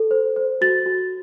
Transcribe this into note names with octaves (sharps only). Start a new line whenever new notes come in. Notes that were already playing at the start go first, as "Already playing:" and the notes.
Already playing: A4
C5
C5
F#4 A6
F#4